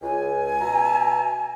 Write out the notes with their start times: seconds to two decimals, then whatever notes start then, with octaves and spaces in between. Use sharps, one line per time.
0.02 C#2 G#5
0.60 B2 E5 A#5